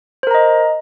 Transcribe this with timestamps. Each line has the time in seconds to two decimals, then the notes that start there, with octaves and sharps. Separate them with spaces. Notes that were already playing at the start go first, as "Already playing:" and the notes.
0.23 C5
0.27 A#4
0.31 A#5
0.35 D#5